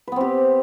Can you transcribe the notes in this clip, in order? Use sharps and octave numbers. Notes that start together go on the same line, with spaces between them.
B3 C4 G4 B4